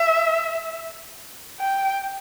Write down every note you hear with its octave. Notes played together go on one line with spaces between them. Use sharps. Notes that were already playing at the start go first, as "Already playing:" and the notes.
Already playing: E5
G5